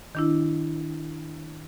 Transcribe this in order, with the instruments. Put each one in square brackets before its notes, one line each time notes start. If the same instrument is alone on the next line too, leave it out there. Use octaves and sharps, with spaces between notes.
[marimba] D#3 D4 E4